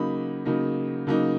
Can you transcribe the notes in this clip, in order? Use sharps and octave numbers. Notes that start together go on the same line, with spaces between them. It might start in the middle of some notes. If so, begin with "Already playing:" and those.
Already playing: C#3 F#3 A#3 D#4 B5
C#3 F#3 A#3 D#4
C#3 F#3 A#3 D#4